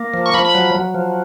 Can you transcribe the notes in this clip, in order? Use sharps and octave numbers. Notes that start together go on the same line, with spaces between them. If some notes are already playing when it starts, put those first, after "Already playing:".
Already playing: A#3
F3
C#6
F3 B5
B5
F#3
F#3
F3